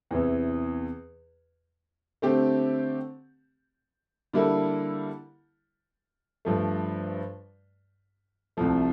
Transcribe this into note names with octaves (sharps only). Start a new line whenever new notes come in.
E2 C3 E3
D3 A3 C4 G4
D3 G3 A#3 E4 A4
G2 F3 A3
C2 C3 F3 A3